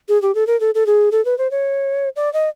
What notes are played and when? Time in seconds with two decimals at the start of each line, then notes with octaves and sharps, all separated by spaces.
0.09 G#4
0.22 G4
0.35 A4
0.47 A#4
0.60 A4
0.75 A4
0.86 G#4
1.12 A4
1.25 B4
1.38 C5
1.51 C#5
2.16 D5
2.33 D#5